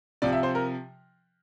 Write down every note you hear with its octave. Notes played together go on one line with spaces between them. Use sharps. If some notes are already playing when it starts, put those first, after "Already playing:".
C3 F3 D5
E5
C5
A#4